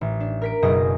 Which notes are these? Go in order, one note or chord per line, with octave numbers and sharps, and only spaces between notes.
A1
D4
A#4 B6 D7
F#1 F#2 B2 G#4 D#5 A#6